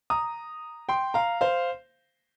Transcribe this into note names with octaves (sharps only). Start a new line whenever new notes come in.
A#5 D#6
G5 C6
F5 A#5
C5 F5